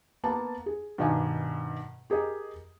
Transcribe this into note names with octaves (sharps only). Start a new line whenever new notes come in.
A#3 B3 A5
G#4
G2 B2 D#3 D4 D#5 G#5
G4 G#4 A#4 D#5